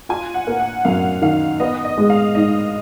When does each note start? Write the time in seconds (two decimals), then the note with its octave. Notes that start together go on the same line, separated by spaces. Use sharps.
0.09 F4 G#5
0.34 F#5
0.47 A#3
0.59 F#5
0.85 F#2 F5
1.22 D#3 F5
1.60 B3 D#5
1.85 D#5
1.98 G#3
2.10 F5
2.35 G#2 D#5